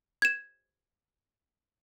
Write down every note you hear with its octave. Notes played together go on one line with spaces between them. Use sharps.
G#6 E7